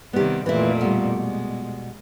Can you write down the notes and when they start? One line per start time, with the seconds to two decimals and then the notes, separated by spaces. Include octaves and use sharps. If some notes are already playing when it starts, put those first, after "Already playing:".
0.13 C3 D#3 G3 B3 G4
0.46 F2 A#2 E3 A3 E4
0.81 B2 G3
1.20 G#3